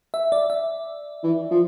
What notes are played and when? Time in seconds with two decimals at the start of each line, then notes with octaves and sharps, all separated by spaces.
0.14 E5
0.32 D5
0.50 E5
1.23 E3
1.51 F3